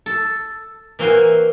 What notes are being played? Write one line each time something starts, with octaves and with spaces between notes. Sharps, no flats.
A4
E3 A#3 C4 F#4 C5 G#5